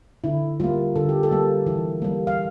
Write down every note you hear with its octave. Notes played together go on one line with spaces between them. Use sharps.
D3 E4
G3 A#3 F4
D3 A4
G4
A4
G3 A#3
E3
G3 A#3
F5